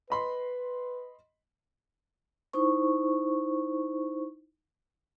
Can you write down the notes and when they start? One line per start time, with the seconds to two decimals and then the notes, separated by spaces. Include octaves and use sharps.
0.10 B4 D#5 B5 C6
2.53 D#4 E4 C5 C#6